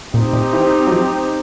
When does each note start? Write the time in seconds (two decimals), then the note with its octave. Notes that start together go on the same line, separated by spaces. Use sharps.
0.14 A#2 C4 D#4 G4
0.33 A#2
0.53 E3
0.87 F#3
0.92 F3